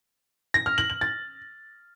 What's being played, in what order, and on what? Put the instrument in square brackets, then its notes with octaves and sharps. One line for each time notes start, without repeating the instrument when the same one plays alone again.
[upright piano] A#6
F6
F#7
F#7
A6